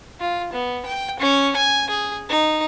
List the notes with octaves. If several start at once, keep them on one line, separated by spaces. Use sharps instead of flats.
F4
B3
G5
C#4
G#5
G#4
D#4